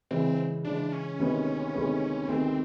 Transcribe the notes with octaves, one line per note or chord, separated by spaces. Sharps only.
C#3 E3 G#3 C4
C#3 E3 G#3 D4
C#4
D2 C3 D#3 G#3 B3
D2 C3 D#3 G#3 B3
D2 C3 D#3 G#3 B3 C4